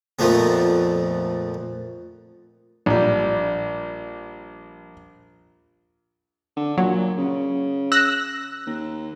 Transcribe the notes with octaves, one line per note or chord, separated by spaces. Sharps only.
F2 A#2 F3 A3 B3
A#1 G3
D3
A#2 F#3
C#3
E6 F#6 A#6
D#2